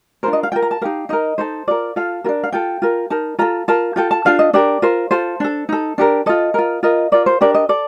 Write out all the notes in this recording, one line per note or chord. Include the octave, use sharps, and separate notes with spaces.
D4 F4 A#4 C5
D#5
F5
F4 A#4 G5
A#5
A5
D#4 G4 A#4 F5
D#4 A#4 D#5
D#4 A4 C5
F4 A#4 D5
F4 A4 F5
D4 F4 A#4
F5
F4 A4 G5
F4 A#4
D#4 A#4 A5
F4 A4 A#5
F4 A#4 A5
F4 A4 G5
A5
D4 F4 A4 F5
D#5
D4 G4 A#4 D5
F4 A#4 C5
F4 A4 C5
D4 A4
D#4 A4
D4 G4 A#4
F4 A4 D#5
F4 A#4
F4 A#4 D#5
F4 A#4 D5
C5
D4 G4 A#4 D5
D#5
A4 D5